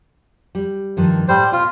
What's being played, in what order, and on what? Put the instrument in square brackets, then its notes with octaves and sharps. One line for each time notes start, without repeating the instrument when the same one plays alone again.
[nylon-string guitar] G3
G2 D#3 F3
[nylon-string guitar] A2 [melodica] G3 C5
[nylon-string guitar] B2 [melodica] F4